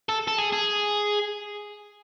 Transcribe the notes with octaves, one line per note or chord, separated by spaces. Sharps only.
A4
A4
G#4
G#4